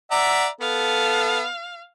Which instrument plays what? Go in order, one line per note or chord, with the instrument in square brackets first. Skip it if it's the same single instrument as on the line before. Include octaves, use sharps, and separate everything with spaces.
[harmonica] D5 E5 A#5 [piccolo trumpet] F#5
[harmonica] B3 [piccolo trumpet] A4 [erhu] F5